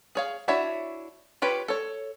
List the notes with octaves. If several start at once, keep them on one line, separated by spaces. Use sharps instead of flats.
G#4 C#5 F5
D4 E4 F#4 C#5 E5
F4 G4 B4 C#5
A4 C#5